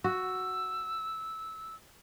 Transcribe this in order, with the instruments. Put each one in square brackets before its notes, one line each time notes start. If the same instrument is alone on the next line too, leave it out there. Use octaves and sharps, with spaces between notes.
[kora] F#4 [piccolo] E6